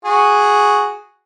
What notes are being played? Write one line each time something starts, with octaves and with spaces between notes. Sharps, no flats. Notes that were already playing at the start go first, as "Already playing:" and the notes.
F#4 G#4